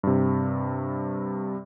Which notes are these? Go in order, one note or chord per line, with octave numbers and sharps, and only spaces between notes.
G2 C3